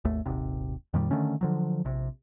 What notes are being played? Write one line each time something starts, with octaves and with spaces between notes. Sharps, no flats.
G#1 D#2 A3
D#1 G#1 C3
F2 A#2 D#3 G3
D3 D#3 A3 C#4
D3 F3 F#3
A#1 C3